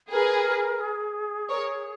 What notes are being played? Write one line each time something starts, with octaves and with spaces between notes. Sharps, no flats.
G#4 A#4 B4
G#4
A#4 C#5